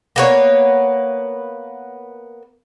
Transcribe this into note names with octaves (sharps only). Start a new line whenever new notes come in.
A#3 B3 C#5